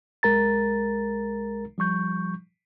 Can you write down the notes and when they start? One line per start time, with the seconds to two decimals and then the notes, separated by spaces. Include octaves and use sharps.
0.23 B1 G#3 A#4 A#5 A6
1.78 F3 G3 C#6 G6